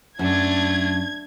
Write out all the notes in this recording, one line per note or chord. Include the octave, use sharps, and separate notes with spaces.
F#2 A3 D4 G#6